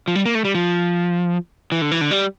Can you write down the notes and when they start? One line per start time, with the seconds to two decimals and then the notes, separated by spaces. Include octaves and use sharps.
0.08 F3
0.15 G3
0.26 A#3
0.35 A3
0.45 G3
0.55 F3
1.72 E3
1.82 D3
1.92 E3
2.01 D3
2.11 G3